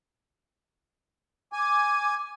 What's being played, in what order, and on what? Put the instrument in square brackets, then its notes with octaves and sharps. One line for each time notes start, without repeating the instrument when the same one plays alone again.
[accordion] G#5 [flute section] D6